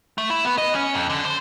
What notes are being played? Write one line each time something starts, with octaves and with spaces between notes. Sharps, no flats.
A3
E4
B3
D#5
C#4
F2
D3
C5